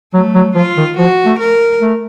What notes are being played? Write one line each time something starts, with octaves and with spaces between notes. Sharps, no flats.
F#3 A3
F#3
F3 F4
D#3
F3 F#4
A3
A#4
A3